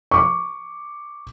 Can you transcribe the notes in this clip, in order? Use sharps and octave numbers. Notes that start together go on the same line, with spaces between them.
C#6 D6